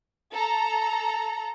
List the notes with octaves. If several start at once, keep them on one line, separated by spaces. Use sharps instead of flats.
A4 A#5